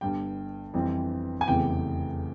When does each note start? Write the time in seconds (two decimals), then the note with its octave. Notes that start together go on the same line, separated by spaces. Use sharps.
0.01 G1 G2 G3 G5
0.74 F2 E3 G3 C4
1.41 G#5
1.47 F1 E2 C#3 E3 G5